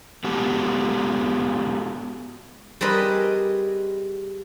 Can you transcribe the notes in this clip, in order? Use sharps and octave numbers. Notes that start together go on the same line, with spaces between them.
G#3 B3 F#4 G4 A4
G3 C4 G#4 A#4 B4 D#5